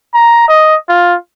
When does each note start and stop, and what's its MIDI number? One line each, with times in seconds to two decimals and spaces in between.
0.14 0.45 82
0.48 0.75 75
0.89 1.15 65